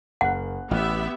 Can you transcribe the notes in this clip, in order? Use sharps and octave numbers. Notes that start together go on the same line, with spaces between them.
F#1 A#4 F#5 F#6
A1 B3 G4 E5 F6 F#6